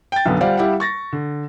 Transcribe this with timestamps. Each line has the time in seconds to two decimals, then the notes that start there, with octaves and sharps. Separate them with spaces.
0.12 G5 A6
0.26 B1 F#2 D3 B3
0.41 G3 F4 C5 D5 F5 F#5
0.57 G3 E4 G4 F5 F#5
0.80 C#6 A6 A#6
1.13 D3